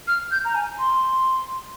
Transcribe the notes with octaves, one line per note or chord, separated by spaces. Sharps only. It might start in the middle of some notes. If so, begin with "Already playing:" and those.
F6
G6
A#5
G#5
C6